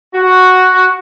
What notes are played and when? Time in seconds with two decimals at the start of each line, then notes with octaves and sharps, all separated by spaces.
0.14 F#4